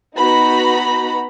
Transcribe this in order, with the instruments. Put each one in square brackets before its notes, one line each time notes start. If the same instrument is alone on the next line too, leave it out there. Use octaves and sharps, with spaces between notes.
[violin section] B3 D#4 F#4 A#5 B5